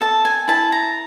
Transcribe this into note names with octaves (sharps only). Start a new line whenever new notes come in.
A4 A5
G#5
E4 A5
A#5